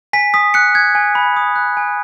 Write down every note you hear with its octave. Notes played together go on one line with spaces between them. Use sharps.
G#5 B6
D#6 B6
F#6 C#7
F#6 G#6
G#5
B5
D#6
F#6
G#5